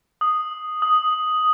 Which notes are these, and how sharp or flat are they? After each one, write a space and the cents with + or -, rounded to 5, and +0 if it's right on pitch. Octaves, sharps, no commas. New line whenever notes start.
D#6 -5
D#6 +5